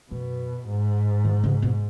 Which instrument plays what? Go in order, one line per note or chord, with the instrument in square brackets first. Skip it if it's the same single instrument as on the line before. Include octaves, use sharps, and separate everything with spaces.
[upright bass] F#2 [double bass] B2
[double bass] G#2
[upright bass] D#3
C#3
B2